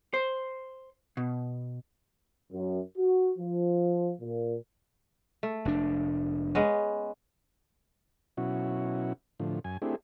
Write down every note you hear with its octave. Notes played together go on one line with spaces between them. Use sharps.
C5
B2
F#2
F#4
F3
A#2
A3
F1 D4
G#3 B3 C#4
B2 F#3 C#4 E4 F#4
A2 D3 F3
F#2 G#5
A3 C4 D4 E4 G4 G#4